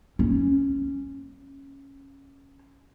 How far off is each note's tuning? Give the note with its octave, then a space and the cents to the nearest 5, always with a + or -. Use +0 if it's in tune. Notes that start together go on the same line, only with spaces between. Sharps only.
C#4 -10